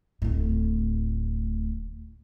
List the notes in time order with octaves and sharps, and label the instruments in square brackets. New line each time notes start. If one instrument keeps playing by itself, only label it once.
[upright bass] D1 A2